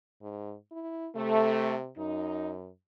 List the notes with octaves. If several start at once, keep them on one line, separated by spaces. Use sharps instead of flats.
G#2
E4
C3 A3
F#2 D#4